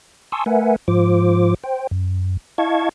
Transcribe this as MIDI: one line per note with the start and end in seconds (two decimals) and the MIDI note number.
0.32 0.44 80
0.32 0.44 81
0.32 0.44 84
0.32 0.44 85
0.32 0.44 87
0.32 0.44 88
0.46 0.76 57
0.46 0.76 70
0.46 0.76 71
0.46 0.76 76
0.46 0.76 78
0.46 0.76 80
0.88 1.54 44
0.88 1.54 53
0.88 1.54 65
0.88 1.54 72
0.88 1.54 86
1.64 1.87 72
1.64 1.87 79
1.91 2.37 42
2.58 2.89 64
2.58 2.89 75
2.58 2.89 77
2.58 2.89 81
2.58 2.89 85
2.58 2.89 92